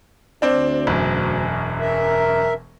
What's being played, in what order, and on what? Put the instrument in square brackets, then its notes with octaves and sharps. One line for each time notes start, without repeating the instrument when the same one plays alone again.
[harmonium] D2 [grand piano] C4 D4
[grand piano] E1 F#2
[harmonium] A#4 E5